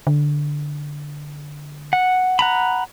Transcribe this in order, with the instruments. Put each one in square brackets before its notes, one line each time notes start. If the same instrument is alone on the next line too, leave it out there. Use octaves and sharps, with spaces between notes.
[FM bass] D3
[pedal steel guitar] F#5
F#5 A#5 B5